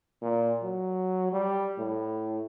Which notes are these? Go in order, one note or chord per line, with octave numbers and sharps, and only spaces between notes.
A#2
F#3
G3
A2